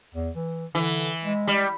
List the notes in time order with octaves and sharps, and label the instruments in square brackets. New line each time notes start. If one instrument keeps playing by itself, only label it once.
[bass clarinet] E2
E3
[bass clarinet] D3 [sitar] E3
[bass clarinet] G#3
[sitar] G3